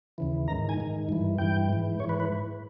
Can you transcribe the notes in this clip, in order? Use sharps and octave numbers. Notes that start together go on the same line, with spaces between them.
D#2 C#3 E3
G#2 D#3 A#5
G#5
G#2 D#3
G2 E3
G2 E3 G5
G#2 E3
G#2 E3 C#5
B4
B4